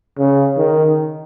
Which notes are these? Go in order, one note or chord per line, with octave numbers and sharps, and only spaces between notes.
C#3
D#3